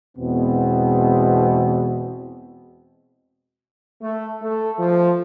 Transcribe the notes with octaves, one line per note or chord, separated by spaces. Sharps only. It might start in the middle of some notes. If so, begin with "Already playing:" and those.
E2 B2 G#3 B3 C4
A3
A3
F3